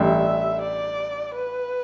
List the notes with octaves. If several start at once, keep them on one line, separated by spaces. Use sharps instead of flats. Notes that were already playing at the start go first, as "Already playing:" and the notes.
Already playing: A1 G2 G3 D4 E5
D5
B4